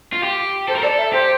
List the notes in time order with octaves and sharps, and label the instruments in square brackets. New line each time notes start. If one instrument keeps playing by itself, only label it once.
[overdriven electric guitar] F4
G4
[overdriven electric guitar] A4 [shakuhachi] C5
[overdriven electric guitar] A#4
[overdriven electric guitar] A4 [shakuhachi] D5
[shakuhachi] E5
[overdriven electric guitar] G4 [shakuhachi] C5